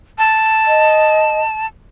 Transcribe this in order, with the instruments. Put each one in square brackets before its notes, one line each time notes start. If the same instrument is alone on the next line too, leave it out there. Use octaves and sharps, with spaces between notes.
[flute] A5
[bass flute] D#5